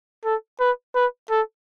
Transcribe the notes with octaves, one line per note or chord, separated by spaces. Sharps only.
A4
B4
B4
A4